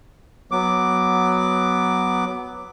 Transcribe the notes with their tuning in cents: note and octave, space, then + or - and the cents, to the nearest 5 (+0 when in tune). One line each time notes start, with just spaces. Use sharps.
F#3 +0 B3 +0 D6 +0